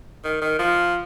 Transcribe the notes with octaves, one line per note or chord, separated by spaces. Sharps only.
D#3
D#3
F3